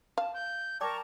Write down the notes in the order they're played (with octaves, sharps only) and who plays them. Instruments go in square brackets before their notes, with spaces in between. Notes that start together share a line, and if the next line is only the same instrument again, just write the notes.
[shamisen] F5 [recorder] A5
[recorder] G6
[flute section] A#4 A5 A#5 [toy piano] D5 G5 D6 [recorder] C#6